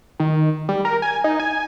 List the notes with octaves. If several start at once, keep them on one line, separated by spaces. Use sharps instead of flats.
D#3
G3
A#4
G#5
D#4
G#5